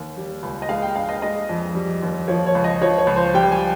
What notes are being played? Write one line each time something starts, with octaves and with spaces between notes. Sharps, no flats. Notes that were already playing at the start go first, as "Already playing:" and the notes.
Already playing: D#2
G3
C#2
D#5
G#3 F5
G5
G2 F5
D#5
G#3 D#5
F2
G3
D#2
F3 C#5
C#5
C#2
D#5
F3 C#5
C#5
C#2
C5
G3 G5
G#5